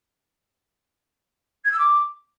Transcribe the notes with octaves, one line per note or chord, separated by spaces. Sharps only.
G#6
E6
D6